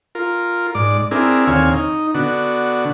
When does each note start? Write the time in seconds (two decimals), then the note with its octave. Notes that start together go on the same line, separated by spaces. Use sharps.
0.15 F4 A#4
0.75 G#2 D5 D6
1.11 C4 D4 E4 G#4 A#4
1.47 D#2 D3 C4 C#5 F5 G#5
1.72 D#4
2.14 D3 B3 D4 F#4